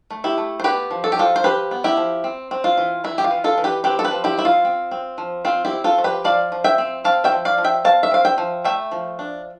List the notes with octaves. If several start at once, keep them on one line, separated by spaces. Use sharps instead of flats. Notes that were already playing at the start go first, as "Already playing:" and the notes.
A3
E4 G4
A3
C5
B3 G4 B4
F3
A4
G4
F3 F4 A4
C5
F3 G4 B4
B3
E4 G4
F3
C4
C4
F4
E3
E3 E4
G4
F4
E3
F4 A4
E3
G4 B4
C4 G4 B4
A4
G4 B4
F3
E4 G4
C4 E4
F4
C4
C4
F3
C4 F4
E4 G4
C4
F4 A4
F3
G4 B4
F3 D5 F5
F3
E5 G5
C4
C4 F5 A5
E5 G5
F3
D5 F5
F3
E5 G5
C4 F5 A5
E5
C4 F5
E5 G5
F3
A3 E5 G5
F3
D4